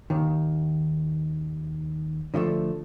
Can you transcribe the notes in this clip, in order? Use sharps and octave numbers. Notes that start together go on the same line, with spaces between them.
D#2 D#3
D3 F3 G#3 A3